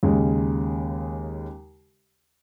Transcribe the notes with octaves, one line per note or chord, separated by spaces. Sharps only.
D#2 C#3 G#3